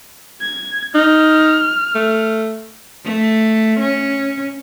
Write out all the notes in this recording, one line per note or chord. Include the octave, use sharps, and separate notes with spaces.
G#6
D#4 F6
A3
A3
C#4